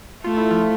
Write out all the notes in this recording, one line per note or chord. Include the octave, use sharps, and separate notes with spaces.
A3 F4
E4
F3 F4